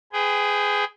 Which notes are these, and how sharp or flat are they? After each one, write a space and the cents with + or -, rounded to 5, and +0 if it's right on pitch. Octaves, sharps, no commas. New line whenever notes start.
G#4 +0 B4 +40 G5 +10